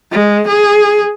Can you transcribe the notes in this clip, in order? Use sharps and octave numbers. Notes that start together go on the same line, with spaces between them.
G#3
G#4